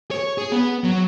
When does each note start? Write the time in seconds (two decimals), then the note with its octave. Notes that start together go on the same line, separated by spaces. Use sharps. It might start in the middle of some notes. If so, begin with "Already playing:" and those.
0.11 C#5
0.38 G#4
0.52 B3
0.84 F#3